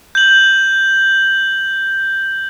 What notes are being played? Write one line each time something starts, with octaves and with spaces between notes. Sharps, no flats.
G6 F#7